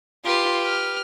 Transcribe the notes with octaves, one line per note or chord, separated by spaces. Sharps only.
F4 G4 B4 C7
F6